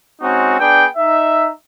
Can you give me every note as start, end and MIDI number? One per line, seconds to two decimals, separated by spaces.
0.21 0.57 56
0.21 0.57 60
0.21 0.57 61
0.21 0.57 63
0.21 0.57 66
0.59 0.85 59
0.59 0.85 62
0.59 0.85 68
0.59 0.85 79
0.97 1.50 63
0.97 1.50 76